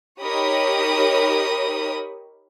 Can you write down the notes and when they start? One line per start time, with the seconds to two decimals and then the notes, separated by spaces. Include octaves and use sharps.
0.21 D#4 G4 A#4 C#5 B5 D#6